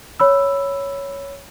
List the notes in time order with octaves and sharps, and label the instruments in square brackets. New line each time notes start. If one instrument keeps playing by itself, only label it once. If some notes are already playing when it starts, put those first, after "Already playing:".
[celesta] C#5 B5 E6